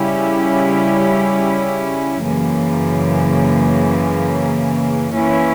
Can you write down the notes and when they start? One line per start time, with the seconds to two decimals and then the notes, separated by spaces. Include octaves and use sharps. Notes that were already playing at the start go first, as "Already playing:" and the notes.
Already playing: C#3 G3 C#4 E4 G4
2.22 F#2 C#3 E3 A#3
5.13 E3 A#3 C#4 E4